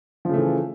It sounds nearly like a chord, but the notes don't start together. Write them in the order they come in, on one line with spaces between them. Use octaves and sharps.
F3 C#3 A3 E3